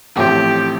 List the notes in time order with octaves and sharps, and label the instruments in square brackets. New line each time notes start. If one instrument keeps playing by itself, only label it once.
[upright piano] A1 A2 F3 C4 [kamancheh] G4